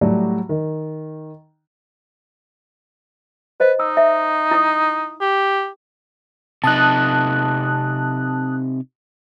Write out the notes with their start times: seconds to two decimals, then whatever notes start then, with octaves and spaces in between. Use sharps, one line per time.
0.01 A2 F#3 G3 F#4 D5
0.49 D#3
3.60 B4 C5 D#5
3.80 D#4 E6
3.97 E5
4.51 E4 D#6
5.21 G4
6.64 C3 D#4 A5 D#6 F#6